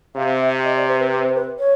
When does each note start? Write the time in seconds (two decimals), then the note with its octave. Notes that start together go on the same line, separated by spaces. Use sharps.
0.16 C3 F5
0.40 E5
0.64 D#5
0.76 D5
0.88 C5
0.99 B4
1.11 B4
1.24 C5
1.35 B4
1.59 C#5